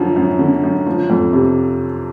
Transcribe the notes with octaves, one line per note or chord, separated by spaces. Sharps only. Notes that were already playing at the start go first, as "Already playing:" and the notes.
Already playing: F#2 D3 F3
F#2
D3
F#2
F3
F2
C3